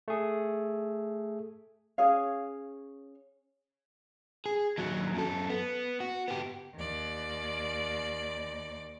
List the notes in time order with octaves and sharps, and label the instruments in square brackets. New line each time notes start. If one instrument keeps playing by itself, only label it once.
[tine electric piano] A3 G#4
[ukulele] C#4 G#4 C#5 F5
[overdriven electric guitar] G#4
D#2 F#3
F#2 A4
B3
F#4
B3 G4
[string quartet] D#2 D5